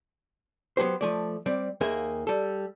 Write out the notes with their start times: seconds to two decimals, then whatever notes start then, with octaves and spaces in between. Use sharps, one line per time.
0.77 F#3 B3 G4 C5
1.01 F3 A3 D5
1.46 G3 C4 D5
1.81 D#2 D#3 A#3 G#4 E5
2.27 G3 A4